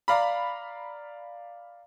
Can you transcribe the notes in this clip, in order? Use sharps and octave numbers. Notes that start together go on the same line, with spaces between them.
D5 F5 A#5 B5